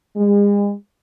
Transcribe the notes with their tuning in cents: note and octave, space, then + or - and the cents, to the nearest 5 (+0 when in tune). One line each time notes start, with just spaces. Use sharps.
G#3 -40